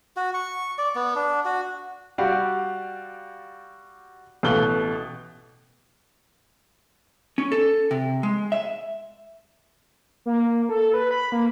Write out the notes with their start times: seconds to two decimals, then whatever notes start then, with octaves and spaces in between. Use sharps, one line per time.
0.17 F#4
0.34 C#6
0.78 D5
0.96 B3
1.16 D4
1.45 F#4
2.18 G3 F#4 G4 D5 F5
4.43 A1 B2 A3 F5 F#6 G7
7.38 C#4
7.52 A4
7.91 C3
8.23 G#3
8.52 E5
10.26 A#3
10.69 A4
10.94 B4
11.11 B5
11.32 A#3